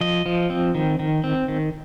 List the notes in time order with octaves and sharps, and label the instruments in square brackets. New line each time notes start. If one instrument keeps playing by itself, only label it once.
[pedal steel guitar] F3 D#5
F3
C4
D#3
D#3
C4
D#3